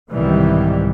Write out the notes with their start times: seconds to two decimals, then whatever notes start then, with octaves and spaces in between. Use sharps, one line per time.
0.12 C2 G#2 B2 D#3 E3 G3